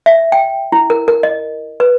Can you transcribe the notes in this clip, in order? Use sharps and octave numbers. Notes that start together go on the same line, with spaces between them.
E5
G5
E4
A#4
A#4
D#5
B4